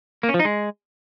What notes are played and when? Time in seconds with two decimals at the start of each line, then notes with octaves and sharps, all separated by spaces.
0.23 A#3
0.29 C#4
0.34 F3
0.40 D#4
0.45 G#3